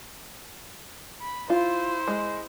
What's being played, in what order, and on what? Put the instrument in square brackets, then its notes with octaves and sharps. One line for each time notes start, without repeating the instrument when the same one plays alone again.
[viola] B5
[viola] E4 C5 [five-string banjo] F4
[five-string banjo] G#3